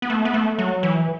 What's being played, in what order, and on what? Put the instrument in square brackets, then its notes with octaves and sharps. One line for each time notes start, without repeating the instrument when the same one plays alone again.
[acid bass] B3
A3
B3
A3
F#3
E3